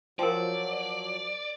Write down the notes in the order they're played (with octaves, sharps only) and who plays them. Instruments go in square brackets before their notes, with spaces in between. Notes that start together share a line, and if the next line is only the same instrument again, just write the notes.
[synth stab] F3 [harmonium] F#3 [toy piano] A#4 G5 [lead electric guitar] D5